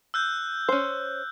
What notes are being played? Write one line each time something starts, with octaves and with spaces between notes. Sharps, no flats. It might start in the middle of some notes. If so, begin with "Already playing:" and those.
E6 F#6 G6
C#4 C5